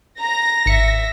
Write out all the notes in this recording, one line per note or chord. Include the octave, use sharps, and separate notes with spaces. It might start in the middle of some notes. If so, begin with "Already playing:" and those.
A#5 A#6
G#1 E5 C#7